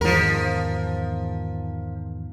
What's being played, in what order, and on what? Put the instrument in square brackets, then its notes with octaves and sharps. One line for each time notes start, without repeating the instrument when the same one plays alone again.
[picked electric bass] E2 G#2 D#3 [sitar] F3 A#4